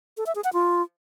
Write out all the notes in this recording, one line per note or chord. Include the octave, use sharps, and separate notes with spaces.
A4
E5
G#4
F#5
F4